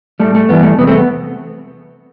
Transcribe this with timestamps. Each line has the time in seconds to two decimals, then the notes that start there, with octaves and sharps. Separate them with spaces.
0.20 A2 G3 A3
0.35 A3
0.49 G2 E3 G3 B3
0.63 A3
0.78 E2 C3 G3 B3
0.87 A3 C4
0.97 B3